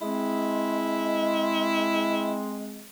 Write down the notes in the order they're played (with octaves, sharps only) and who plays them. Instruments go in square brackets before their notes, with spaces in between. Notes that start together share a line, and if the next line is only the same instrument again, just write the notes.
[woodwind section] G#3 C4 [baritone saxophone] E4